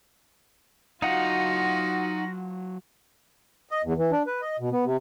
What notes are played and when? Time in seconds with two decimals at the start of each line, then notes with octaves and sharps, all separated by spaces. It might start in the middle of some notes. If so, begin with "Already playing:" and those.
1.02 F#3 D#4 F4 F#4 F5 F#5 A#6
3.71 D#5
3.84 E2
3.97 E3
4.12 D4
4.27 B4
4.41 D#5
4.60 B2
4.72 B3
4.85 C3